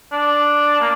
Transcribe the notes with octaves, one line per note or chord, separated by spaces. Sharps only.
D4
A#3